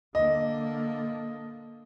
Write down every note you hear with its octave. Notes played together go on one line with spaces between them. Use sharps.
D3 A#3 D#5